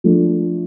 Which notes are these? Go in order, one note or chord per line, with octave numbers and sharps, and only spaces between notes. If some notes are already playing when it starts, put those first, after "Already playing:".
F3 A3 D4